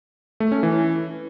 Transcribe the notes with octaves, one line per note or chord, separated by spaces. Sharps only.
A3
C#4
E3